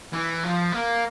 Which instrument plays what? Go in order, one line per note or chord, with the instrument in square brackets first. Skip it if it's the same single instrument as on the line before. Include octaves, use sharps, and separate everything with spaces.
[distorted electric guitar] E3
F3
A#3